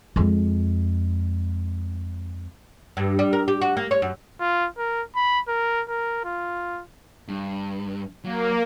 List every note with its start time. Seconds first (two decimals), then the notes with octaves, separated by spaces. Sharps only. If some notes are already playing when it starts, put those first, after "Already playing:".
0.16 F2 G#3
2.97 G2
3.19 G3
3.33 A#4
3.48 G4
3.61 F#4
3.77 A#3
3.91 C#5
4.02 F#2
4.40 F4
4.78 A#4
5.16 B5
5.48 A#4
5.89 A#4
6.24 F4
7.28 G2
8.24 F#3 A#3